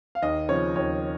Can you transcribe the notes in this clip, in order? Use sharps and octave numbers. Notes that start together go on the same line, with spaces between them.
F5
D#2 D#5
C#3 F3 C4 C#5
D#2 C#5